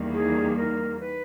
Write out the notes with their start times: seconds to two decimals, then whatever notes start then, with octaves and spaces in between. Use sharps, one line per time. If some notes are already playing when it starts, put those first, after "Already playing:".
Already playing: E2 D#3 G3 A#3
0.14 G#4
0.57 A#4
1.00 B4